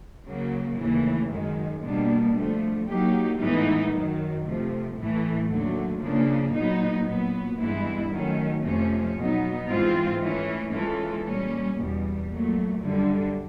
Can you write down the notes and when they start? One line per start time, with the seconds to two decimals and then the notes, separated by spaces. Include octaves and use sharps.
0.27 C#3 F#3 A#3
0.78 D#2 C#3 E3 A3
1.31 F#2 D#3 G#3
1.84 B2 G3 A#3 D4
2.36 D3 F3 A3
2.88 F#3 A#3 D#4 G4
3.40 A2 E3 G#3 B3 D#4
3.92 F#2 D#3 F#3
4.45 C3 F3 A3
4.97 A2 E3 A3
5.49 D#2 D3 F#3 A3
6.02 C#3 F3 A#3 D4
6.54 A#2 F#3 B3 D#4
7.07 A#2 F#3 B3
7.59 G2 E3 G#3 B3 E4
8.11 D#3 F#3 A3 C#4
8.63 F2 C3 F3 A3 C#4
9.16 B2 F#3 B3 D#4
9.68 G#2 E3 G#3 C4 F4
10.20 E3 A3 C#4
10.73 E3 G#3 C#4 F4 A4
11.25 A#2 G3 A#3 C#4
11.78 E2 B2 G3
12.30 A#2 F#3 A3
12.83 F#2 D3 G3